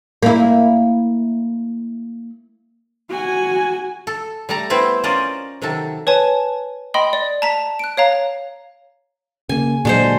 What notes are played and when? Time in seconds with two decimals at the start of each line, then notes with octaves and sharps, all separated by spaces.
0.23 A#3 E4
3.09 F#4 G#5
4.07 A4
4.49 G3 A3 A5 A#5
4.70 B3 C4 E4 C5
5.04 C#4 F4 A#4 C5 D5 D#5
5.62 C3 D#3 F#3 A4
6.07 B4 C#5 G#5 A5
6.94 D#5 G5 B5 C6 D#6
7.13 D5
7.42 A5 A#5 B6
7.79 F#6 D7
7.97 C#5 F5 A#5
9.49 C#3 A#3 G#5
9.85 A#2 D3 F#3 G#3 C5